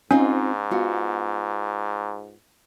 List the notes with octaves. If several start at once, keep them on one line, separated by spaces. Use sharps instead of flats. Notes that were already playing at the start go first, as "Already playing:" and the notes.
G#2 C4 C#4 D#4 F4
B3 F4 F#4